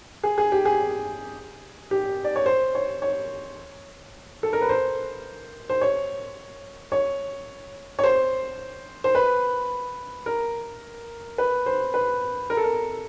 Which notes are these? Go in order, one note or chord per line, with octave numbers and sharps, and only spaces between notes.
G#4
G#4
G4
G#4
G4
D5
C#5
C5
C#5
C#5
A4
A#4
B4
C5
C5
C#5
C#5
C#5
C5
C5
B4
A#4
B4
C5
B4
A#4
A4
A#4